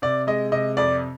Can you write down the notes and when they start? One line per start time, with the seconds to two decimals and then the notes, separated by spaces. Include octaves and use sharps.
0.02 C3 D5
0.27 G#3 D#5
0.52 C3 D#5
0.77 F2 D5